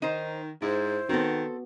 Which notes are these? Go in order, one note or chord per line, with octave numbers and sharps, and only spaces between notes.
D#3 D#4 C5
G#2 E4 C5
D#3 B3 C4 F#4 A4